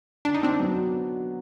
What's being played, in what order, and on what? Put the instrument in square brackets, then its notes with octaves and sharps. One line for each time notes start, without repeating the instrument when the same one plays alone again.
[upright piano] D3 [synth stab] D4
[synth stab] D#4
C4 D4
[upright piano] F#3 B3